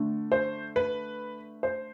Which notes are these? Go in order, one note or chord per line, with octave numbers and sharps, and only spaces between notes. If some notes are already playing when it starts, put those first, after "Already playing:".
Already playing: D3 A3 D4
C5
B4
C5